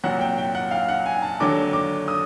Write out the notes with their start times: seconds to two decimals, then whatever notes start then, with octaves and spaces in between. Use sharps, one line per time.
0.04 C2 A#2 F#3 F#5
0.21 G5
0.38 G5
0.55 F#5
0.71 F5
0.88 F#5
1.06 G#5
1.22 A5
1.40 D#2 D3 F#3 D6
1.73 D6
2.08 D#6